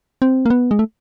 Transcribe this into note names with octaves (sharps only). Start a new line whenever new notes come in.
C4
A#3
B3
G#3
A3